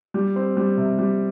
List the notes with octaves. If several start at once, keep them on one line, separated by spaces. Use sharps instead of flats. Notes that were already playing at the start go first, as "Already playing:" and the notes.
G3
C4
G3
C3
G3